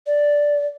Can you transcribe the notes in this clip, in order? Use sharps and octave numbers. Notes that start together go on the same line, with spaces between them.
D5